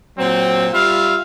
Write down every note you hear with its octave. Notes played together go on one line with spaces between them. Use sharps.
A#2 F#3 C4
G3 F4 E5 F5